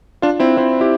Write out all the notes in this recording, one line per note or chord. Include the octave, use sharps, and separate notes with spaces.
D4 F4
C4 E4
C4 E4
E4 G4